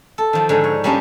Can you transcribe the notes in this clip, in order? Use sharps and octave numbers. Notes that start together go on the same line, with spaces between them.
A4
D#3 F3
G#2 D3 G#3
C#5
G3 A#3 C#4 D4 D#5